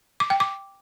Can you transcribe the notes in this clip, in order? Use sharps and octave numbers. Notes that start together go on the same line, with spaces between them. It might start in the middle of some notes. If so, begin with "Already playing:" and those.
D6
G5
D6